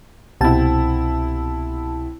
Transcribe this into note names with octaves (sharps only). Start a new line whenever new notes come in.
C2 B2 C4 E4 A5